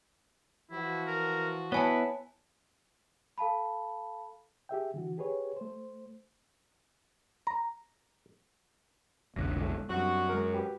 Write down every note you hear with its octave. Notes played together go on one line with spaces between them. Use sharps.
E3 F3 E4 F#4
A#4
B3 E4 B4 C#5 G#5 A5
A4 F5 A5 B5
G4 G#4 E5 G5
D3 E3 F#4
G4 G#4 B4 C#5
A3 C5
A#5
F1 B1 D3 F#6 A#6
G#3 A3
F#2 G3 C4 D4 F#4
G#3 A#4
F#4 G4 B4